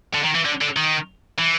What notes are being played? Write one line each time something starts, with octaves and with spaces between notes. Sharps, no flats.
D3
D#3
E3
D3
D3
D#3
E3